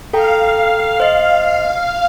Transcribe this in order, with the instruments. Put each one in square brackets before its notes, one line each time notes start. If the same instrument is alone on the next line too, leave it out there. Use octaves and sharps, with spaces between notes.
[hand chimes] A4 G5 A#5 [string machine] F5
[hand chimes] C5 D#5